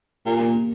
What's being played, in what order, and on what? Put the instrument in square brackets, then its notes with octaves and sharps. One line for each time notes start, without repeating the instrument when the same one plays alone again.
[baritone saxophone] A#2 [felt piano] G4
[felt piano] A#3
A#3